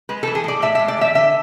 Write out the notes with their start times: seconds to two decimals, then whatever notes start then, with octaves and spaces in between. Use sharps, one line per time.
0.09 G#3 B4
0.23 A4
0.27 E3
0.35 G#4
0.44 A2 D5
0.62 A2 E5
0.75 E5
0.79 G#3
0.88 D5
0.98 E3 E5
1.15 D3 E5